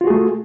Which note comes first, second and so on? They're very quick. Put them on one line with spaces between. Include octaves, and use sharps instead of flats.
F4 F#4 G#4 A3